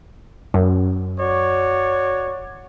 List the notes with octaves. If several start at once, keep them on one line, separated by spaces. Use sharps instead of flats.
F#2
F#4 C#5 D5